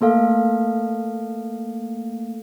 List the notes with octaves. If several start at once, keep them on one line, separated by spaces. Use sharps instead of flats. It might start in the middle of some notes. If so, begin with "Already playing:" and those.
A3 A#3 A4 F5